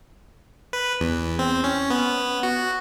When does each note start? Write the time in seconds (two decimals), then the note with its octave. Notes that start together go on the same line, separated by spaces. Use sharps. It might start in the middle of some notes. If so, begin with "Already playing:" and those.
0.73 B4
1.00 E2
1.39 C4
1.64 C#4
1.90 B3
2.43 F#4